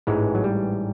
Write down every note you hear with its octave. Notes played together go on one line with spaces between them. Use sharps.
A1 G#2 E3 G#3
F#3
G3